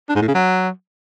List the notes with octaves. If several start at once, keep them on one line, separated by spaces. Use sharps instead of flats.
D4
G#2
A2
C#3
F#3